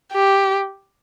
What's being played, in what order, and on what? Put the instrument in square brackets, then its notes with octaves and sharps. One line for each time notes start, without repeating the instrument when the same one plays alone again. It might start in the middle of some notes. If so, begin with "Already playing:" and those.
[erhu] G4